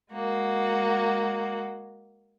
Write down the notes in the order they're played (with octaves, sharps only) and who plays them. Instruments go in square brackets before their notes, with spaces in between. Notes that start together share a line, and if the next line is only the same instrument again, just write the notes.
[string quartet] G#3 A#3 F#4